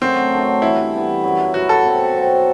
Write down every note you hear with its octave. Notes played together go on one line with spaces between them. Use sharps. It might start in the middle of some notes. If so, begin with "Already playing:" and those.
F#2 D3 F#3 A3 C4
F#2 D3 F#3 A3
G2 E3 B3 E4
G2 E3 B3
F#2 F#3 B3
F#2 F#3 B3 F#4
A4
B2 F#3 C4
B2 F#3 C4